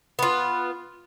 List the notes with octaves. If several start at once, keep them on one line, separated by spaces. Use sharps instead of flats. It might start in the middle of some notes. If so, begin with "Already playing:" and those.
B3 F4